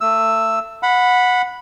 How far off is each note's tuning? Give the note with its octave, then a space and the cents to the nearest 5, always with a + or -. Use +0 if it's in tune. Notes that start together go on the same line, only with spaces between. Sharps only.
A3 +30 E6 +0
F#5 -20 B5 +0